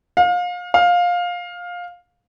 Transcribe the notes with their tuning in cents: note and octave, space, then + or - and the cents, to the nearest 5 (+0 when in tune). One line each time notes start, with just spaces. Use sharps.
F5 +30
F5 +15